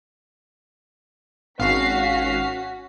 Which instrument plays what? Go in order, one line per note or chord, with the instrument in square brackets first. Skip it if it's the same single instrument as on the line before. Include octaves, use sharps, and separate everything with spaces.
[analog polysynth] G#1 F5 C7 [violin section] C#4 F#4 B6